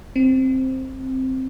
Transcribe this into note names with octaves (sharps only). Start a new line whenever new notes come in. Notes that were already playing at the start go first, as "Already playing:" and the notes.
C4